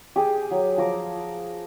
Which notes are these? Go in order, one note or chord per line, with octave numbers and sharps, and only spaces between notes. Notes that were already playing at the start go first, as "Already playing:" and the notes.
G4 G#4
F#3
F3 A#5 D6